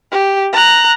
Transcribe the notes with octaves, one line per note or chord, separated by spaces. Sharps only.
G4
A#5 F#6